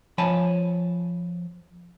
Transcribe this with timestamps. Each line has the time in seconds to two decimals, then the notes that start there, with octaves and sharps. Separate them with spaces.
0.18 F3 C#5 G#5 A5 B5